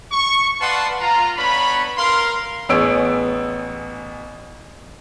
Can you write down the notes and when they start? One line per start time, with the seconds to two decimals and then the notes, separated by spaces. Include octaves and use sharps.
0.12 C#6
0.61 B4 D5 F5 F#5 A5 C6
1.01 F4 A#5
1.37 B3 D4 C#5 B5
1.97 A#4 F5 C6
2.69 A1 B3 G#4 C#5 E6 D7